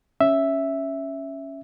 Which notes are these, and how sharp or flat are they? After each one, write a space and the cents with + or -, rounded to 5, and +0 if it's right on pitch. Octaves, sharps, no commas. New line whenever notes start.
C#4 +0 E5 +0